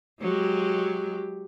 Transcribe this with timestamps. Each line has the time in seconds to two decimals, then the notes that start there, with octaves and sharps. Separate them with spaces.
0.21 F#3 G#3 G4